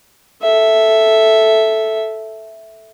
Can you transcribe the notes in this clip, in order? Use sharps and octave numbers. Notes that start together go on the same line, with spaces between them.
A4 E5